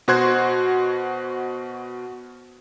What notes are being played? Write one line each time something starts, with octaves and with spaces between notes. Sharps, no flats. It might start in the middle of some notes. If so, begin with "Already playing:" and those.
B2 F#4 C5 C6 F#6 G#6